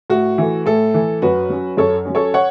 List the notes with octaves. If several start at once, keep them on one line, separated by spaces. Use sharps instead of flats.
A2 F#4
E3 A3
A2 A4
E3 A3
F#2 F#4 B4
F#3 C#4
F#2 A4 C#5
F#3 C#4
A4 C#5
C#5 F#5